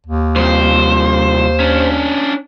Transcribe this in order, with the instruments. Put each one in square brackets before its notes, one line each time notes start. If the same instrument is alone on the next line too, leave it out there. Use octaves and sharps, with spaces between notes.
[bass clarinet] D#2
[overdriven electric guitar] C2 F2 [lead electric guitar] C5
[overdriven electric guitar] C#4 D4